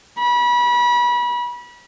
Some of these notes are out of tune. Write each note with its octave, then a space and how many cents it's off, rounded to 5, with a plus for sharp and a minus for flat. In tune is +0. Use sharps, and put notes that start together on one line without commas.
B5 -30